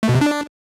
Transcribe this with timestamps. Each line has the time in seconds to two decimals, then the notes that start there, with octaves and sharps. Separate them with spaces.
0.03 A3
0.09 B2
0.15 C3
0.21 D4